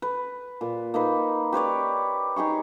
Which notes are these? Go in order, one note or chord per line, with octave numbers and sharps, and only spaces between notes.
B4
A#2
A#3 D#4 B4
G4 B4 C#5 D5
D#4 G4 G#4 C#6